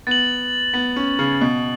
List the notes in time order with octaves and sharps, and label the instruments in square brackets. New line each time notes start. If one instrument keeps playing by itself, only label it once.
[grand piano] B3 [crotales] A6 F#7
[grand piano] B3
C#4
C#3
B2